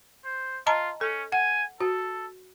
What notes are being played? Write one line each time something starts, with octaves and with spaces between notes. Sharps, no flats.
C5
F4 D#5 A5 A#5
C#4 A4
F#5 G#5
F#4 A4